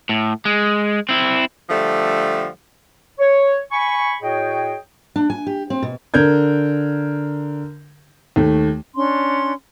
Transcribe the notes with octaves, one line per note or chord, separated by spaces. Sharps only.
A2
G#3
C4 E4
D3 F3 G3 A3
C#5
G#5 B5 C#6
A2 F#4 G#4 C#5 D#5 G5
D4
G#5
G4
C4
B2
D3 A#4 G6 G#6
D#2 A3
C#4 D4 C6